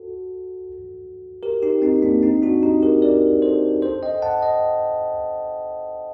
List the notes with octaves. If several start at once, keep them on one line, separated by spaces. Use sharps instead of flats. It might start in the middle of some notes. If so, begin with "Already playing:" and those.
Already playing: F#4 A4
G4 A#4
D#4 G4
C4 D#4
A#3 D4
C4 D#4
D4 F#4
D#4 G4
G4 A#4
A#4 D5
A4 C5
A4 C5
D#5 G5
F#5 A5
D#5 G5